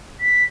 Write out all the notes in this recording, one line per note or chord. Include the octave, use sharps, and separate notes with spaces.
B6